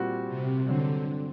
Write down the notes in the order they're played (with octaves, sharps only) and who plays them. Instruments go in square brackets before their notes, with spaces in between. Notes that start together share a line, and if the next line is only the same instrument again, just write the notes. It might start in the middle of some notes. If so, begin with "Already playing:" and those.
Already playing: [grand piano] A#2 G3 C4 F#4
[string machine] C3
[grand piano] G2 F#3 C4 [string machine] D3